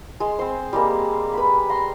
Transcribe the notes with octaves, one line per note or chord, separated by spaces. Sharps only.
G#3 C6
C4 C5
G3 G#3 A#3
B4 B5
A#5 C6